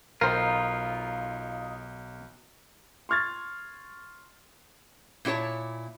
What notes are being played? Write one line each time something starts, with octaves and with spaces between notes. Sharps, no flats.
B1 D#4 F4 A#4 C5 G5
C6 C#6 F6 G#6 A6
A#2 E4 F#4 C#5 A5